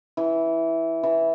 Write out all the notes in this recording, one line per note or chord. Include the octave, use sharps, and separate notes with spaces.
E3
E3